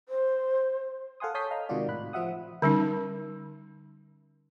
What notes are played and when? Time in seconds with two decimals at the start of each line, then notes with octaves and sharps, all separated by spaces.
0.09 C5
1.20 A4 F5 F#5 G#5 C6 D#6
1.34 C#5 A5 D#6 G6 B6 C7
1.51 D#5 F5 A#5 F6
1.69 C3 D#3 G#3 F4 F#4 D5
1.88 A2 B5 F#6
2.13 F3 F4 E5 F#5 D#6
2.62 D3 G3 C#4 D#4